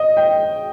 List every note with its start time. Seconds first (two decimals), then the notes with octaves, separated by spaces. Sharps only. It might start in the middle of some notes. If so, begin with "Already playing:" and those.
Already playing: D#5
0.17 G5